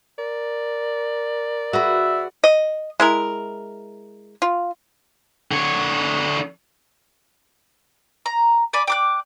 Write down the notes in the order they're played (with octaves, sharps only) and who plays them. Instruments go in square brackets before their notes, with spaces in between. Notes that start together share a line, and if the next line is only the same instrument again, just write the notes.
[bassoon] A#4 [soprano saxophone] D5
[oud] F#4 G#4 B4 [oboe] E5
[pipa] D#5
G#3 E4 A#4
F4
[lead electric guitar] D3 C#5
[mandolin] A#5
D5 G#5 B5 D6
G5 D6 F#6